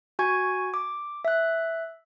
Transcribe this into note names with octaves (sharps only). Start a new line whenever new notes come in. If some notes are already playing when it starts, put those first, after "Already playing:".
F#4 G#5 C#6 G#6
D6
E5 F#6